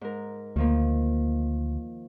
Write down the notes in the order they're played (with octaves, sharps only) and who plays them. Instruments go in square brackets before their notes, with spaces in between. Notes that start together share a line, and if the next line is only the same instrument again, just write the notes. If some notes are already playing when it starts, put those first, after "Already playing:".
[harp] G#2 A#4
[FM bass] D2 [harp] D#3 F3 A#3